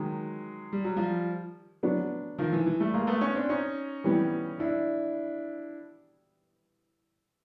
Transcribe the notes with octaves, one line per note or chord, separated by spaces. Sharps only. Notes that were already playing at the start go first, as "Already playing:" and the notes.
Already playing: D#3 F#3 G#3
G3
F#3
F3 G3
F#3 B3 D4
D#3 F3
E3
E3
G3 A3
G#3 A#3
A3 B3
B3 C#4
C4 D4
C#4 D#4
E3 G3 B3
D4 E4